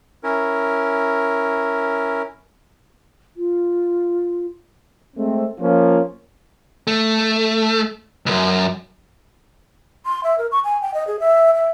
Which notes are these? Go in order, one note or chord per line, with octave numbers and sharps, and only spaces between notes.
C#4 E4 A#4
F4
G#3 A3 C4
F3 A#3 C#4 F4
A3
C#2 F#2
C6
E5
A#4
C#6
G#5
G5
D#5
G#4
E5
E5